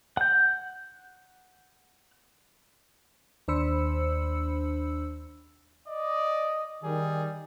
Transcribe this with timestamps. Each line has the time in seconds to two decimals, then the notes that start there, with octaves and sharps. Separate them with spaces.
0.17 F#5 G6
3.48 D#2 D4 C5 B5 E6 C#7
5.88 D5 D#5
6.84 D#3 G3 G#4